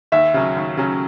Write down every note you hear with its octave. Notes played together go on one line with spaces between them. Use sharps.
D#2 E5
C#3 F#3 C#4
D#2
C#3 F#3 C#4